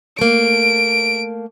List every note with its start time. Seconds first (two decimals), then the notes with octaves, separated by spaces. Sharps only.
0.19 A3 A#3 D7